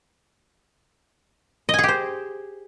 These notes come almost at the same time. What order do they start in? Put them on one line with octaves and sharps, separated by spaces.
D#5 G#5 G#4 G4 C5